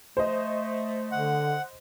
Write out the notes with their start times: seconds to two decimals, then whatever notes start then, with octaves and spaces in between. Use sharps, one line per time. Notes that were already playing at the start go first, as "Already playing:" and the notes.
0.17 A3 C5 D#5
1.12 D3 F#5